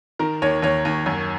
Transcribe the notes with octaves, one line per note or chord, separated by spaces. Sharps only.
D#3 A#4
D#2 C#5
D#2 C#5
D#2
F#2